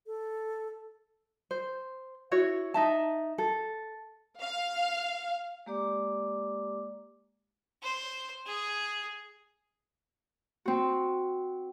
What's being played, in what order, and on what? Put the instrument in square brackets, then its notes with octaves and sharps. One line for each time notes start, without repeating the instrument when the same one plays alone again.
[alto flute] A4
[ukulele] C5
E4 F#4 C#5
D#4 E5 A5
A4
[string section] F5
[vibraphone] G#3 A#3 G4 D5 D6
[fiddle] C5
G#4
[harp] C4 F#4